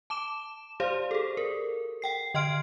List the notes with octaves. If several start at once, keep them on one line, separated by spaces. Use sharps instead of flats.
A5 D6 E7
G4 C5 D5 F5
G#4 A4
A#4
F#5 G5 C7
D3 D#5 G5 C6 F6 D7